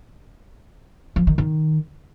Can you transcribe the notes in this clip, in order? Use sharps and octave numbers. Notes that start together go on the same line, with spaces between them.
F3
D#3
D#3